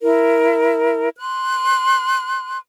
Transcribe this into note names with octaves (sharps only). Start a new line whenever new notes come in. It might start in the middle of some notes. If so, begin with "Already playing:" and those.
E4 A#4
C6 F#6